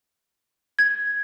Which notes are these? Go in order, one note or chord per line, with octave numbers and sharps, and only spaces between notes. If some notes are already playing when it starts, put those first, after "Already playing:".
G#6